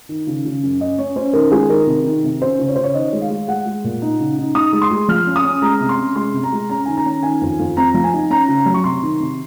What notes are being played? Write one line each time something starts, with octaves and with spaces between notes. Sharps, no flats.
D#3
C#3
C#3
F#2
C#4 D#5
C#4 C#5
C#4 C5
D#3 A#4
G#3 G#4
D#3 A#4
C3
D#3
C3
C#4 C5
C#3
C#5
C#3 C5
C#5
D#3 D#5
G#3
F5
G#3
G#3 F#5
G#3
A#2
D#4
C#3
D#4
D#4 D#6
G#3
C6
G#3
F3 F6
C#4
D#6
C#4
G#3 A#5
C3
C6
C#4
G#3 C6
C3
A#5
G#3
C#4 A#5
D#3 G#5
A#5
C#4
D#3 G#5
F2
F2
C4 A#5
F3
G#5
D#4
C#4 A#5
C#3
F#3
C#6
C3 C6
D#3
C3